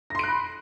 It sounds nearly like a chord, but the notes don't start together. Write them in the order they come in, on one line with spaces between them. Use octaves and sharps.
A#6 C6 D7 F#6 B5